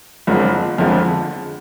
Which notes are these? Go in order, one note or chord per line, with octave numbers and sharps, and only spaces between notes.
F#1 F2 D3 F3 G#3
F#1 F2 D3 F3 G#3